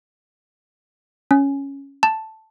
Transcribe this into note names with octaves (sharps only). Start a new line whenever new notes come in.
C#4
A5